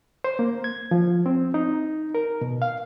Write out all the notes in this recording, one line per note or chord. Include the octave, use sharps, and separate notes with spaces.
C5
A#3
G#6
F3
C4
D#4
A#4
B2
F5